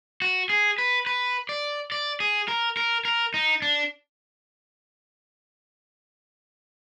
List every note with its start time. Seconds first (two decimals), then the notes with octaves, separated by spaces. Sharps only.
0.22 F#4
0.50 G#4
0.78 B4
1.06 B4
1.49 D5
1.92 D5
2.20 G#4
2.48 A#4
2.77 A#4
3.05 A#4
3.34 D#4
3.62 D4